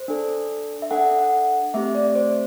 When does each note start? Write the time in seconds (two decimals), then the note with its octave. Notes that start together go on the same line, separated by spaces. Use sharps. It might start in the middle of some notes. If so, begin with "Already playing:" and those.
Already playing: C5
0.08 D4 A4
0.82 E5
0.91 D4 A4 F#5
1.19 F#5
1.74 A3 C4 G4 E5
1.95 D5
2.15 C5